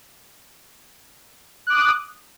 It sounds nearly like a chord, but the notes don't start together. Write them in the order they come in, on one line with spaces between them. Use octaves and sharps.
F#6 D6 D#6